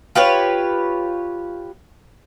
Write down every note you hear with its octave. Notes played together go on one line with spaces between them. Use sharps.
F4 G4 B4 C#5